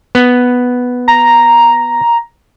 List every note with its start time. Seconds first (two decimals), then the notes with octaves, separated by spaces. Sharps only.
0.15 B3
1.08 A#5